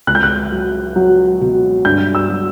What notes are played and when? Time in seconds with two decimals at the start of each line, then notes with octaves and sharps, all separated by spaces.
0.07 C#2 F#6
0.15 G6
0.23 F#6
0.52 F#3
0.96 F#3
1.41 B2
1.85 G2 G6
2.15 E6
2.29 F#3